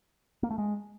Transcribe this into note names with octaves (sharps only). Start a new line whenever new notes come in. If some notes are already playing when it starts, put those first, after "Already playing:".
A#3
A3
G#3